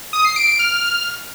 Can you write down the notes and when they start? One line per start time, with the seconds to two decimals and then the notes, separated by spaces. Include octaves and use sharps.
0.13 D#6
0.25 C7
0.36 D7
0.48 D7
0.59 F6